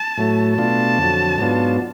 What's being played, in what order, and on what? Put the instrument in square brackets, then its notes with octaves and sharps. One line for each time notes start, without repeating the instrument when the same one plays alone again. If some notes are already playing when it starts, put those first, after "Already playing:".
Already playing: [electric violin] A5
[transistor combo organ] A2 F#3 A3
[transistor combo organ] B2 A3 D4 F4 [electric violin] A5
[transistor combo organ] F2 D3 F#3
G#2 F#3 B3 D4 F4